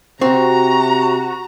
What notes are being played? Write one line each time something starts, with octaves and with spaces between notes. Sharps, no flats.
C3 C4 F#4 A#5